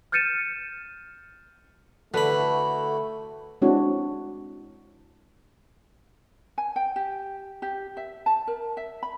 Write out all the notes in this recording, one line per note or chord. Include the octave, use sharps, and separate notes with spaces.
F6 G6 A6 C#7 D#7 E7
D3 A3 E4 F#4 B4 B5
G#3 C4 D4 E4 F#4 C#5
G#5
G5
G4
G4
E5
A5
A#4
E5
B5